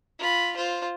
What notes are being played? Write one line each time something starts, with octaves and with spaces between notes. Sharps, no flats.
F4 B5
F4 C5